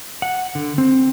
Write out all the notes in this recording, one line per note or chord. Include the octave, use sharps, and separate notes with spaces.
F#5
D3
C4